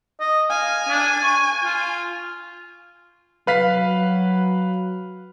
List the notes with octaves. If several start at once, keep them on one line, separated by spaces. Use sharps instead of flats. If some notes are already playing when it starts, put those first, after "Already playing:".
D#5
F5 G#5
D4
C#6
F4
F#3 B4 F5 B6